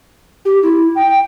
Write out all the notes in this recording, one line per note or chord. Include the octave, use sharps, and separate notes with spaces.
G4
E4
G5